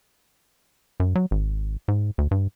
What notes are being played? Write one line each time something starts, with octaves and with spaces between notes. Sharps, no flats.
F#2
F#3
G#1
G#2
D2
G2